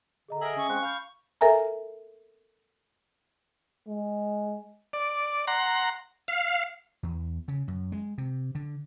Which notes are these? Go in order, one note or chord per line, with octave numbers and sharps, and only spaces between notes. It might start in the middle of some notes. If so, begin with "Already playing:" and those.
D3 G#4 D#5 A#5
G#4 A#4 D#5 E5 F#7
C#4 C#6
G#3 C4 F5 F#6
F5 B5 G6
A4 A#4 E5 G#5 A#5
G#3
D5
F#5 A#5 C6
F5
E2
C#3
F#2
G#3
C3
D3